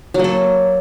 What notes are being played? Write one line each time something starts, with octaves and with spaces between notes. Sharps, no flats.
F#3 A#3 A4